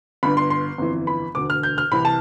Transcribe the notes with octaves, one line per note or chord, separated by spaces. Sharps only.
G1 G2 D3 B5
C6
C6
G1 F2 E3
B5
E1 D2 D3 D6
F6
G6
F6
C2 C3 E3 B5
A5